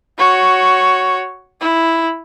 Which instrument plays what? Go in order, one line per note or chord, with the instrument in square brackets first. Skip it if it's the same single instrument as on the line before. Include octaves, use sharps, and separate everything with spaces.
[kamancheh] F#4 C#5
E4